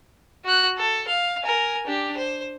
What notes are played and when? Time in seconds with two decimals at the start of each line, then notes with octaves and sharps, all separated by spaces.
0.45 F#4 F#6
0.78 A4
1.08 F5
1.43 A#4 G#5
1.87 D4 G4
2.17 C5